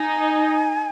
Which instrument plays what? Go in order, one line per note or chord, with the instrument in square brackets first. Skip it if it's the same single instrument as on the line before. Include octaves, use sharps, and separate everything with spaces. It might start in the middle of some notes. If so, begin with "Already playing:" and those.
Already playing: [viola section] D#4 [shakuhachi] G#5